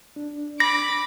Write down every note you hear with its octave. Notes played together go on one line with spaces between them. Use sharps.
D4
B5 D6 A#6